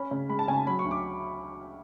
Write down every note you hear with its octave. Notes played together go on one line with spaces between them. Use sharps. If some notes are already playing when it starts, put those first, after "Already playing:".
Already playing: C#4 B5
C#3
G#3 B5
A5
C#3 G#5
A5
F#3 B5
C#6
D2
D6